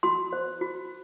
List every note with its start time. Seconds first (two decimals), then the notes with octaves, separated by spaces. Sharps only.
0.03 F#4 C6
0.33 C5
0.61 F#4